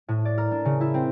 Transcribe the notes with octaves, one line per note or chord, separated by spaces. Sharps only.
A2
D5
A#4
D4
C#3
E4
C4